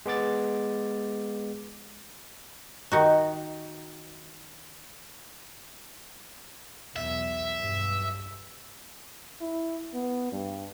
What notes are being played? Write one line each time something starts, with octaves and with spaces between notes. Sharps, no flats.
G#3 B3 D6 A6
D#3 D#4 F#4
B1 E2 E5
B1 G2
E4
B3
G2